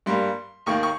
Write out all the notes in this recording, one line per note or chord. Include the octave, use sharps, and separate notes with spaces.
G2 G3 A#3 C6
D#2 D#3 A#3 C#6
C#6